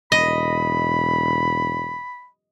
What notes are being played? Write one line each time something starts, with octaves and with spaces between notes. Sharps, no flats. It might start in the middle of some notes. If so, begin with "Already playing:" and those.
E1 D#5 B5